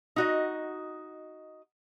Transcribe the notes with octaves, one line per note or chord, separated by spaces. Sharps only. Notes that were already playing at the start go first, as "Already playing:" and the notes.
D#4 F#4 D#5